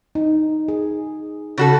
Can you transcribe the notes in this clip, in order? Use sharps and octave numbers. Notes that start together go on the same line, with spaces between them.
D#4
G#4
C#3 F#4 A4